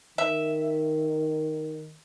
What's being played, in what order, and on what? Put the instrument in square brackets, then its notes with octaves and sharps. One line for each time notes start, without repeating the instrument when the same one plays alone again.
[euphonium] D#3 [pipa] E5